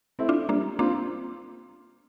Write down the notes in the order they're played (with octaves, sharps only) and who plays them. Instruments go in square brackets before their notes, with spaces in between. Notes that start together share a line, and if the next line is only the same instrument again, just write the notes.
[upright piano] A3 C4 E4
[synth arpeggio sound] D4 F4
[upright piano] G3 [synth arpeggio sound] A#3 D4
[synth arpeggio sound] A#3 D4 [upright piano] C4 F4